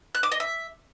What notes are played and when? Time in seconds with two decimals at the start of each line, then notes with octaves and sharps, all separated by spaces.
0.15 F#6
0.23 D6
0.32 D#5
0.40 E5